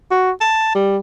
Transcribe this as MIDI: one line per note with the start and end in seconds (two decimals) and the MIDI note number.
0.11 0.31 66
0.41 0.74 81
0.75 0.98 55